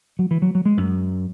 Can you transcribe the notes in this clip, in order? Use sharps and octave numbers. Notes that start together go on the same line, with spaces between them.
F#3
E3
F#3
F#3
G#3
F#2